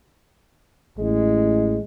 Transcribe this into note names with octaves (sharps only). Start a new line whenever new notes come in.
A1 G#3